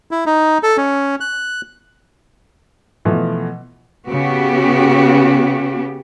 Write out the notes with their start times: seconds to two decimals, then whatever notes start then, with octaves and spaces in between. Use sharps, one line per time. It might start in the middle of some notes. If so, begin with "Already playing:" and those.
0.11 E4
0.26 D#4
0.63 A4
0.77 C#4
1.21 F#6
3.05 B2 E3 F3 A3
4.06 C#3 B3 F#4 G4